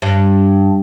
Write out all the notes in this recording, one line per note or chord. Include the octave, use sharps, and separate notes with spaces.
G2